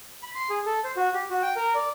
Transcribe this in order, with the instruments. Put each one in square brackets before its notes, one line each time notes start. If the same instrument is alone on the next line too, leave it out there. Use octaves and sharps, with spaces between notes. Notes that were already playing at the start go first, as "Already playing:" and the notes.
[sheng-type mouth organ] B5
C6
G#4
A4
C5
F#4
G4
F#4
G5
A#4
D5